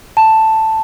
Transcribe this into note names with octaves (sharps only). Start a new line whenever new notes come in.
A5